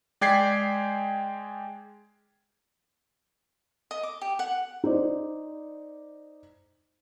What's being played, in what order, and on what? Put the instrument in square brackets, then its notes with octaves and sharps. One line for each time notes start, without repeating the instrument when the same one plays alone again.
[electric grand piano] G#3 D5 G5 G#6 B6 C7
[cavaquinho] D#5
D6
G4
F#5
[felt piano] D#4 C5 D5